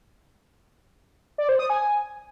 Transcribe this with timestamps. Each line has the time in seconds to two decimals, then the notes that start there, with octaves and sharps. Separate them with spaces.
1.38 D5
1.49 C5
1.59 D#6
1.70 G#5